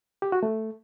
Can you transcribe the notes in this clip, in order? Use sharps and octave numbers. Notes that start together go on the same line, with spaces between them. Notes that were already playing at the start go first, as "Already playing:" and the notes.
G4
F#4
A3